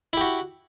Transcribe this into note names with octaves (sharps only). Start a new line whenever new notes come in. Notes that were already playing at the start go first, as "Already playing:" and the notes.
E4 F#4 G4